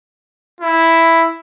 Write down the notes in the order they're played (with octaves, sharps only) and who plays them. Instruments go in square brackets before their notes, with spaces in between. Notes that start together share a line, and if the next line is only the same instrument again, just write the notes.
[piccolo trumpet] E4